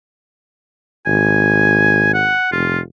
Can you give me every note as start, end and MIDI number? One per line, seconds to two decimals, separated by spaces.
1.06 2.33 32
1.06 2.10 80
2.14 2.52 78
2.52 2.80 29
2.52 2.79 65